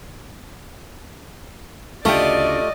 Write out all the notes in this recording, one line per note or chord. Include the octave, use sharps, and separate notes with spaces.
D2 C#3 A3 F4 G4 D5 D#5